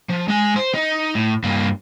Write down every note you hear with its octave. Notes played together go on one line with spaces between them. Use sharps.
F3
G#3 G#5
C5
D#4
A2
G2 A#3